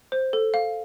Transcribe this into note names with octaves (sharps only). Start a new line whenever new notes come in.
C5
A4
F5